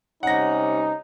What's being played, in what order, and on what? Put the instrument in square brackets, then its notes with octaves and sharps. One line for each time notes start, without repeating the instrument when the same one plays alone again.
[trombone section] C3 G3 C#4 [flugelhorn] D#4 [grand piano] F#5 A#6